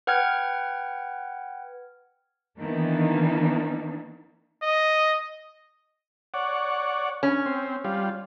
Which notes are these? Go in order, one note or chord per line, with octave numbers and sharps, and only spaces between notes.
B4 F#5 G5 F6 G#6
D#3 E3 A#3 B3 D4 D#4
D#5
C#5 D5 F#5
C#4
C4
G3 F4